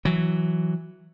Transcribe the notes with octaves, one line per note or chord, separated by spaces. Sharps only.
E3 F#3